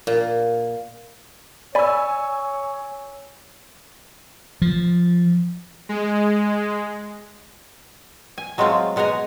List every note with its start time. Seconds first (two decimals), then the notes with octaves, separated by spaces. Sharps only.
0.07 A#2
1.75 C#5 D5 G#5 B5 E6
4.62 F3
5.89 G#3
8.38 G#5
8.58 F#3 G#3 A3 C4 F4
8.96 B2 G#3 F#5 G#5 A#5